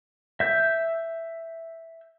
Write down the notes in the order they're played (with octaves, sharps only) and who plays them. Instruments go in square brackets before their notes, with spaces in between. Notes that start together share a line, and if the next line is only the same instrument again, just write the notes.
[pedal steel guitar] E5 G6